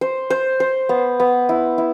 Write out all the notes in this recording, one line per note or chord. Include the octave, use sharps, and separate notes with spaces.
C5
C5
C5
B3
B3
E4
E4